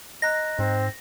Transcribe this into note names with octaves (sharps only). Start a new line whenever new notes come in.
D#5 A#5 F#6 A#6
G#2 C4